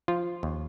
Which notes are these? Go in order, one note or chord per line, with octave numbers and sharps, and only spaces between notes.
F3 F4
D#2